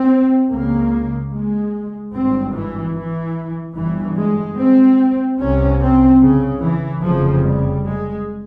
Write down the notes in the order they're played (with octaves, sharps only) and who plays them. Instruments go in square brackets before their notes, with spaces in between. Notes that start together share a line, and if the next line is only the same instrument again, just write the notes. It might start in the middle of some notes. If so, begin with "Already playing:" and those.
Already playing: [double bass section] C4
C#2 C#3 A#3
G#3
G#1 G2 C4
E3
E3
G1 G2 E3
G#3
C4
C2 C3 C#4
C4
C#3
E3
F1 F2 C#3 F3
G3
G#3